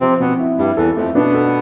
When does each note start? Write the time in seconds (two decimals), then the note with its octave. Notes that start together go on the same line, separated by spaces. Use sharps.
0.01 C3 F3 C4
0.20 B2 B3 C4
0.39 E4
0.58 G2 G3 E4
0.77 E2 E3 A4
0.97 F2 F3 A3
1.15 B2 B3 D4
1.34 A4